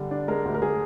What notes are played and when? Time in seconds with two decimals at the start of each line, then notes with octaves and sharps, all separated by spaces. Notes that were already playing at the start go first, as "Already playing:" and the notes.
Already playing: D3 G3 D4
0.11 D4
0.28 G#3 A#4
0.45 D2
0.54 A#4
0.62 G#3 G#4